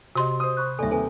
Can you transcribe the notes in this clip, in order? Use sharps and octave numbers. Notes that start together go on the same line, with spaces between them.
C3 F#4 G4 D#5 C6
C5 D#6
B5 C#6 F#6
D#1 D#2 A4 D5 E5 G#5
D#2 C3 A4 B4 G#5